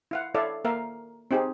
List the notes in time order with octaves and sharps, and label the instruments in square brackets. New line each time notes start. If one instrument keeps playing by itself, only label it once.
[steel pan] E4 F5 F#5
E4 A4 C#5 D5 E5 F5
A#3 A#4 E5 F5
C4 D#4 G4 G#4